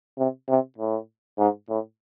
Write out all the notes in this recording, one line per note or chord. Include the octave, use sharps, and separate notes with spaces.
C3
C3
A2
G#2
A2